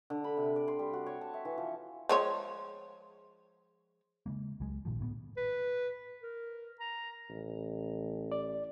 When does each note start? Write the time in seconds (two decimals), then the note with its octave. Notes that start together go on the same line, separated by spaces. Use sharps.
0.10 D3
0.24 B5
0.37 C3
0.56 D5
0.68 C6
0.79 G3
0.93 F#4
1.06 C#5
1.21 A5
1.34 E5
1.45 E3
1.58 F3
2.09 F3 G#3 C#5
4.26 C#3 G#3 A#3
4.60 C#2 F#3 G#3
4.85 A#1 A#2 D#3 F3
4.99 D2 A2 A#3 B3
5.37 B4
6.23 A#4
6.80 A#5
7.30 A1
8.32 D5